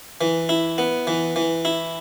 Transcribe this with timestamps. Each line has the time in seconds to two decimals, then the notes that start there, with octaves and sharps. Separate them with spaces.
0.21 E3
0.49 E4
0.78 B3
1.07 E3
1.36 E3
1.65 E4